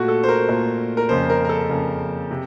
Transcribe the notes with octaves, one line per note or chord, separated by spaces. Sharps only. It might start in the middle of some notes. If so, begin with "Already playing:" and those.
Already playing: A#2 A3 F#4
A4
C5
A#4
A#2 A3
A#4
F2 C#3 F3 A#3 C5
A#4
A#4
A4
F2 C#3 F3 A#3
C3